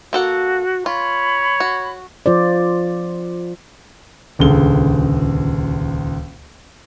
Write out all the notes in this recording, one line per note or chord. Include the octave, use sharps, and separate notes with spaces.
A#3 F#4 A4 F#5
F4 C#5 B5
F#4
F3 F4 C5 D5
D#1 C#2 D3 G#4 G7